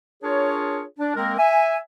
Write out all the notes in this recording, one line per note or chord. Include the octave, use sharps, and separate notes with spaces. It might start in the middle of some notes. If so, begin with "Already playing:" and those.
D4 F4 G#4 A#4 C#5
D4
G#3 A#3 C4 A#4
E5 G#5